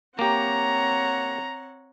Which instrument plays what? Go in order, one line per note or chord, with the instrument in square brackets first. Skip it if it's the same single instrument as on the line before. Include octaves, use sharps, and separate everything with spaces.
[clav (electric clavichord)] A#3 G4 [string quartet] C4 C#5 F#5 [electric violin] A#5